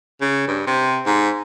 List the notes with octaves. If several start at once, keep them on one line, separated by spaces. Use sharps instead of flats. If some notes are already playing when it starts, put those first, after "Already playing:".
C#3
G2
C3
G#2